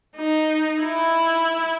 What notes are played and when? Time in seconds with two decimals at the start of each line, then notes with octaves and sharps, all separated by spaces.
0.17 D#4
0.82 E4